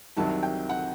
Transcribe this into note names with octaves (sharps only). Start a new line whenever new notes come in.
C2 C3 D#3 F#3 A5
G5
F#5